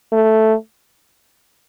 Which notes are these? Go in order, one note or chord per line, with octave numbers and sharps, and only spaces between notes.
A3